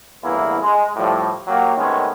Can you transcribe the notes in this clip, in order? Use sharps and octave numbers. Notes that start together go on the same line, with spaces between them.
A1 E2 G2 A#3 B3 E4
G#3
A2 F3 G3
F#3 A#3 G4
C3 D#3 G#3 A3 B3 C#4